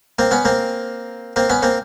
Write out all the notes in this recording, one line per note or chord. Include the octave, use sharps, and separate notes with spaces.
A#3 C4
B3 C#4
A#3 C4
A#3 C4
B3 C#4
A#3 C4